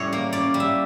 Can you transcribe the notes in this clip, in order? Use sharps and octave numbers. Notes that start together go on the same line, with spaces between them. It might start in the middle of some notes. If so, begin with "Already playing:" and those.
Already playing: A2 G3 C#4 C#5
A#3
C#4 D5
G3
E5